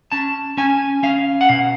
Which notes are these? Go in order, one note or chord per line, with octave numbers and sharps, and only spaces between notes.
C#4 A5
C#4 G#5
C#4 F5
F#5
B2 F5